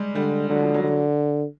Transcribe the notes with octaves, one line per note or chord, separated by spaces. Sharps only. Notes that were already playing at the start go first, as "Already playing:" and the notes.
Already playing: G3 G#3
D3 G3
D3 F#3
F3
F#3
D3